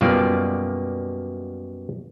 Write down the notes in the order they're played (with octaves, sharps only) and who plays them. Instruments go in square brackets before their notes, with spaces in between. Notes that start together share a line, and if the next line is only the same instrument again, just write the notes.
[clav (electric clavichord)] F#2 B2 G3 A#3 F4 D5